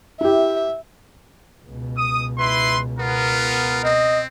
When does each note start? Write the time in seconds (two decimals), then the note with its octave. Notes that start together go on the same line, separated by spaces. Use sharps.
0.21 E4 G4 E5
1.65 C#2 B2
1.97 D#6
2.39 E4 B4 C6
2.99 B3 F4 A#4
3.85 C4 D#5